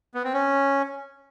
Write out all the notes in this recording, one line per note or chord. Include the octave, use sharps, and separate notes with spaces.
B3
C4
C#4